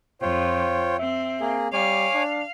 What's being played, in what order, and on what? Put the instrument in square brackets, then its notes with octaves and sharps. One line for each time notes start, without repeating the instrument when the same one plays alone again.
[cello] F2 [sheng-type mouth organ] F4 C#5 G5 [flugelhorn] C5
[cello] C4 [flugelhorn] E5
[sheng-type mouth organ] A#3 G#4
[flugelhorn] G3 [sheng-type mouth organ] C#5 G#5 D6 [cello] F5
[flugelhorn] D4